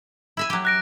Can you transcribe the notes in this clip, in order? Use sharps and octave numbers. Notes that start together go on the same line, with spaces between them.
E4 E5 G#5
F#3 G4
F#6 A#6 D7